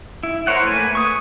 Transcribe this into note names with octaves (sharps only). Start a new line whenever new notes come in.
E4
A#4 C5 C#5 F#5
A3 A#3 B4 G#5
C#6 D#6